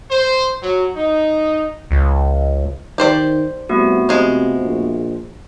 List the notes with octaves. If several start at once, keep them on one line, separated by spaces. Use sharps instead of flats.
C5
F#3
D#4
C#2
D#3 G4 C5 D5
C2 A3 B3 F#4
C3 F3 G#3
A#1